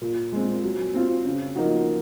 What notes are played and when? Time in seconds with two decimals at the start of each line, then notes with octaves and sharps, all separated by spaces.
0.01 A#2
0.32 G#3 C4
0.64 F#3
0.94 C4 F4
1.25 C#3
1.56 F3 A#3 D#4 F#4